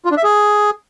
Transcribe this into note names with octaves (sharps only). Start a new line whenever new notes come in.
F4
D4
E5
G#4